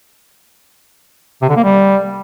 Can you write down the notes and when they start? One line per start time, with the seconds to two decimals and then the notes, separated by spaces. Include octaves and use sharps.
1.42 C3
1.49 D3
1.56 A#3
1.64 G3